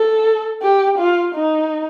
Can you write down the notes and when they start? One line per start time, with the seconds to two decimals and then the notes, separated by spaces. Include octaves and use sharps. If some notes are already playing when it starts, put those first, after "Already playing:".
Already playing: A4
0.62 G4
0.98 F4
1.35 D#4